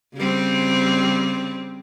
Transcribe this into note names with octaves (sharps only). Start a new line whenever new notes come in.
C#3 G3 C4